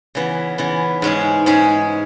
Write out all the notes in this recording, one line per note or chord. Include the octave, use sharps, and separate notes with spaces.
C#3 E3 B3
C#3 E3 B3
G#2 G#3 C#4 G#4
G#2 G#3 C#4 G#4